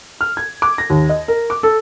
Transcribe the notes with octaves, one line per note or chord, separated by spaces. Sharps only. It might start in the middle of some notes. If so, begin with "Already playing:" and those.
F6
G#6
D6
A#6
D#2
D#5
A#4
D6
A4